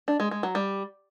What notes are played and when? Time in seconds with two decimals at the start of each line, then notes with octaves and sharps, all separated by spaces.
0.08 D4
0.20 G#3
0.31 G#3
0.43 F#3
0.55 G3